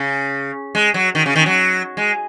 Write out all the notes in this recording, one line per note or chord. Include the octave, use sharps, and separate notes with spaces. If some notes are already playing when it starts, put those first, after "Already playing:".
Already playing: C#3
G#3
F#3
D#3
C#3
D#3
F#3
G#3